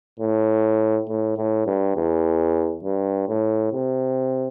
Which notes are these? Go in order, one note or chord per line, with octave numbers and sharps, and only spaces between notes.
A2
A2
A2
G2
E2
G2
A2
C3